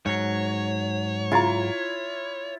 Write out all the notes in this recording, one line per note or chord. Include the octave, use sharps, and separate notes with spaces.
G#2 F#3 C#5
C#3 E4 F4 A#5